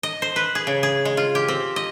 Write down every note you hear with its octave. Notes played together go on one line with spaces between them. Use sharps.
D#5
C5
B4
G#4
C#3
G#4
G#3
F4
G4
C4
D#5